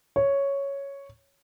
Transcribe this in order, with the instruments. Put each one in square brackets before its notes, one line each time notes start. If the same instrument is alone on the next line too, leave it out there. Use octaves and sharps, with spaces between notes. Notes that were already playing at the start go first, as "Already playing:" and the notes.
[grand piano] C#5